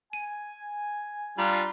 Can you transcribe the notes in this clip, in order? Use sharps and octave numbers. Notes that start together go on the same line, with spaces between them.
G#5 D#7
G3 D4 F4 A#5 B5